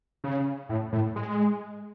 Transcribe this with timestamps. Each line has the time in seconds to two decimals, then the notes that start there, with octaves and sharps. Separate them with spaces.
0.24 C#3
0.69 A2
0.92 A2
1.16 G#3